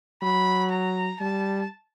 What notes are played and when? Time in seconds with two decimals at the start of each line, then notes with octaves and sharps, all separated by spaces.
0.22 F#3 B5
0.71 A#5
1.20 G3 A5